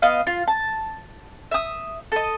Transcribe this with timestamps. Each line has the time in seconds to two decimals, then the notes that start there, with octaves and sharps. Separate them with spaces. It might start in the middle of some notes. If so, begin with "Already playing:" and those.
0.02 B3 D#5 F5
0.27 F4
0.48 A5
1.51 E5 D#6
2.12 A4 D#5